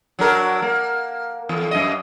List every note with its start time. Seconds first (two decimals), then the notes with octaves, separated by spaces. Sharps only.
0.19 F#3 D4 A#4
0.62 A#3
1.49 E2
1.71 F#2 D#5